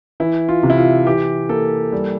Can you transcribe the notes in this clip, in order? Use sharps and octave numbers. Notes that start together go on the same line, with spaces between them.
E3 E4
F4
C3
E4
F4
E3 G4
A#3 A4
G3